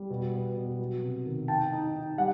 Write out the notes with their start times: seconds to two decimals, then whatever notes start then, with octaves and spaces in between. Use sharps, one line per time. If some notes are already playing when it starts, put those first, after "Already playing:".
Already playing: G3
0.10 B2
0.33 B3
0.57 B2
0.79 F#3
1.03 C3
1.26 D#3
1.48 D#4 G5 A5
1.72 D#4
1.95 D#4
2.18 G3 F#5